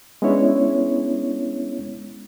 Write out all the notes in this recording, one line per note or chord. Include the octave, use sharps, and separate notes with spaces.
G#3 B3 C#4 D4 E4 C#5